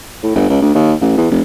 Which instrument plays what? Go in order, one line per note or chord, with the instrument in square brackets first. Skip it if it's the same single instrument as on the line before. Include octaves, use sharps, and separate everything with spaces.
[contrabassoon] A2
G1
C#2
D2
D#2
A1
E2
F1